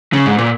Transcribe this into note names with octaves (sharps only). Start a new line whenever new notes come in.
C#3
G#2
A#2